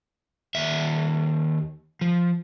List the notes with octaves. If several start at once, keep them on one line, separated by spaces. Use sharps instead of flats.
D#2 E5
F3